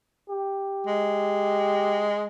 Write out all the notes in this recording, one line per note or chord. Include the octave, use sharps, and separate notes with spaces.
G4
G#3